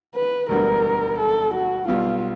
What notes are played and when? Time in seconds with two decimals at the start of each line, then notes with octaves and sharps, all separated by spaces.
0.15 B4
0.49 E1 D2 D3 G3 B3 A#4
1.18 A4
1.54 F#4
1.88 B1 B2 G3 F4